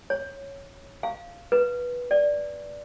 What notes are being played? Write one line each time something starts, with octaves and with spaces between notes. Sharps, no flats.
C#5
F5
B4
D5